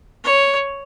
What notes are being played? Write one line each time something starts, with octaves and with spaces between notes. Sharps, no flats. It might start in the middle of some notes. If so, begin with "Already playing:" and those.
C#5